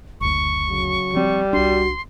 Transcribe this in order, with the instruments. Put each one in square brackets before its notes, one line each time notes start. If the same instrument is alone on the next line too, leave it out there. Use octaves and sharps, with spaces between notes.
[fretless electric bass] F#1 D2 [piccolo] C#6
[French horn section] C#3 F#3
[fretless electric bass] F3 C4 [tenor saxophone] G3
[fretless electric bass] C2 D4 [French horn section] F#4 [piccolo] C6